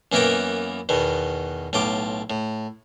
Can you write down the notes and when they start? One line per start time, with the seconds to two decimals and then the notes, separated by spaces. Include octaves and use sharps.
0.12 F#2 E3 A#3 B3 A#4 G5
0.89 E2 B2 D#3
1.73 B1 A2 F4 C6 D6
2.30 A2